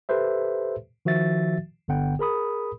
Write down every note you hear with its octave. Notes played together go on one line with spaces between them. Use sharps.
G4 A4 B4 C5 E5
D#3 F3 F#4 E5 A6
G1 D3 B3 F#5 G5
G#4 A#4 B5 D#6